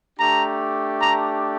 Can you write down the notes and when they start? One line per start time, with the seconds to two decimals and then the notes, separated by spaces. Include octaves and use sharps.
0.17 A3 D4 G4 A#5
1.00 A#5